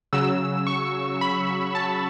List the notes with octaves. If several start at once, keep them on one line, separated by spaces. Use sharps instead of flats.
C#3 F#3 E6
C#6
B5
A5